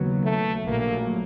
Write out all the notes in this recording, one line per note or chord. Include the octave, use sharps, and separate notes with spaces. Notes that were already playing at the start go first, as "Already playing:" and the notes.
Already playing: D#2 C#3 F#3 B3
A3
A#1 A#2 F#3 A3 A#3